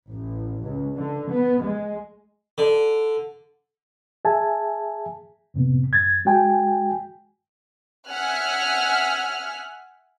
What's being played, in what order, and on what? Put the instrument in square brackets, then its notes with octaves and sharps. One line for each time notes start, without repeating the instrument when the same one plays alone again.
[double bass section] A1
C#2
D3
B3
G#3
[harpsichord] D3
[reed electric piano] G#4 E5 G#5 A5
F2 A2 C3 B3
F#2 G#6 A6
G#3 F#4 G5 G#5
[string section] E5 F#5 G#5 F6 F#6